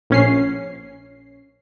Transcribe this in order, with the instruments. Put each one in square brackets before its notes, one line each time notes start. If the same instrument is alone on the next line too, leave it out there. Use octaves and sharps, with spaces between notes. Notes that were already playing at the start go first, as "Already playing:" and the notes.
[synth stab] A#1 C#4 C7